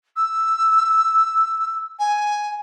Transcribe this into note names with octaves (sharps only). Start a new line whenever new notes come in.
E6
G#5